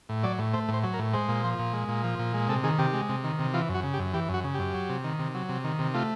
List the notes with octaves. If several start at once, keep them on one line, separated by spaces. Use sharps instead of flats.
A2
F#3 D5
A2
A3 C5
A2 C5
F#3
A#4
A2
G#3 C5
A#2
F3
A#2
G#3
A#2
F3
A#2
G#3
C3 A4
D#3 G#4
C3 G4
G#3
C3
D#3
C3
E3 F4
F#2
F#4
C#3
G4
F#2
E3 G4
F#2 F#4
C#3
F#2 G4
F#3
C3
D#3
C3
F#3
C3
D#3
C3
A3 F4